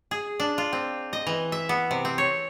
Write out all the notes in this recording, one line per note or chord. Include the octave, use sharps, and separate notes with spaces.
G#4
D4
F4
C4
D#5
E3
E5
B3
C3
C4
C#5